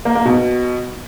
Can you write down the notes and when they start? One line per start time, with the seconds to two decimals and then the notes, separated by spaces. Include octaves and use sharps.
0.05 A#3
0.15 A#3
0.25 B2